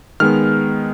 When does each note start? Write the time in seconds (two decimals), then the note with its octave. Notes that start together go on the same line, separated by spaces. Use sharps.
0.20 D#3 G#3 B3 F6